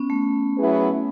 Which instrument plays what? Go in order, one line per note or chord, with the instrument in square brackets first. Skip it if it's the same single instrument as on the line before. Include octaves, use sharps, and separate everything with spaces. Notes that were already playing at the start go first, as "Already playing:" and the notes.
Already playing: [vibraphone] B3 C#4
A3
[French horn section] F#3 B3 E4 G#4 B4